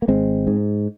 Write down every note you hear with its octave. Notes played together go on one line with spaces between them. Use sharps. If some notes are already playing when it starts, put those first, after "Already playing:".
A#3
G#1 G#3 C4
G#2